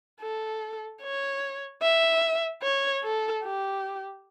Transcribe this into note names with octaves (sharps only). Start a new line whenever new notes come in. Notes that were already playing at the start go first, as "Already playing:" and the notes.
A4
C#5
E5
C#5
A4
G4